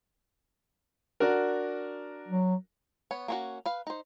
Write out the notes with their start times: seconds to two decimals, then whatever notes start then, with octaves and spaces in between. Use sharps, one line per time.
1.20 D4 F#4 A#4
2.28 F#3
3.11 B3 C#5
3.28 A#3 C#4 F#4
3.66 B4 F5
3.87 D#4 C5